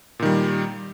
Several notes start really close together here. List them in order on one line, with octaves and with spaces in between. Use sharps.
A#2 D#3 G3